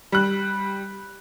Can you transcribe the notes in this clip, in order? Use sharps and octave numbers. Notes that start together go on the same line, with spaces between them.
G3 F#6